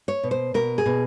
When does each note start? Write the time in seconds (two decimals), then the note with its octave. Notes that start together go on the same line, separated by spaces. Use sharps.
0.08 C#5
0.23 B2
0.31 C5
0.54 B2 A#4
0.78 G#4
0.86 B2